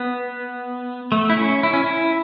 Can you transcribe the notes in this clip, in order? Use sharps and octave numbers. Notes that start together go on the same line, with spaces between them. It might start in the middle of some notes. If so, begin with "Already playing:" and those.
Already playing: B3
A3
E4
C#4
E4
C#4
E4